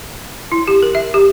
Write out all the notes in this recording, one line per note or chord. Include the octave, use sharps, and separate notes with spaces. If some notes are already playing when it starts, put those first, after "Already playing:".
E4
G4
A#4
E5
G4